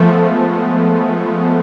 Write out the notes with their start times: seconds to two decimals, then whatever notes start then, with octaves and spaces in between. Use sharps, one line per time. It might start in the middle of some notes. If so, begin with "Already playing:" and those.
Already playing: F3 G#3 A3 B3